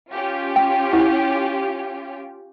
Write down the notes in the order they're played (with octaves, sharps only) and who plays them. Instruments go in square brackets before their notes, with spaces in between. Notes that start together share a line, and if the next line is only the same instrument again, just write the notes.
[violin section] C#4 F4 G4
[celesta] G5
[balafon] E4 F#5